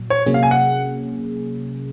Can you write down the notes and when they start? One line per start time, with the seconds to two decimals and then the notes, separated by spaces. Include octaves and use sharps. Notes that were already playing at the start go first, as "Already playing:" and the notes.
Already playing: A#2 F#3
0.10 C#5
0.26 C3 F#3 A#3 C#4 G#4
0.34 F5
0.43 G#5
0.51 F#5